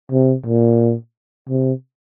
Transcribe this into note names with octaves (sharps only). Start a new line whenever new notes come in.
C3
A#2
C3